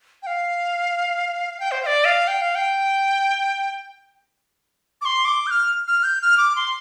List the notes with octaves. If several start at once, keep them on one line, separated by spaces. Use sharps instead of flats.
G5
F5
G5
C5
F5
D5
F5
G5
F5
G5
D6
C6
D6
G6
F6
F6
G6
F6
D6
C6